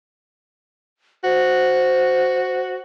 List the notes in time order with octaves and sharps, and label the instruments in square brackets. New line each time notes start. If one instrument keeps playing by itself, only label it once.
[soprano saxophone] F#4 [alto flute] C5